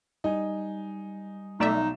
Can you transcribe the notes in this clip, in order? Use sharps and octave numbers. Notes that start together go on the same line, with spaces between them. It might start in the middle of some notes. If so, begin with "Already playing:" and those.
G3 D#4 G#5
B1 A3 D#4 D5 E5 E7